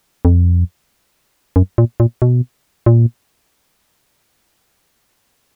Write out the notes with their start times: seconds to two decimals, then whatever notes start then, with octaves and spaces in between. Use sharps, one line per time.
0.25 F2
1.56 F#2
1.78 A#2
2.00 A#2
2.22 B2
2.86 A#2